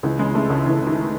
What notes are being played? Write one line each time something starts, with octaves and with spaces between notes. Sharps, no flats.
C#2 E3
C#3 G#3
C#3 A3
C#2
C#2 E3
C#2
D#3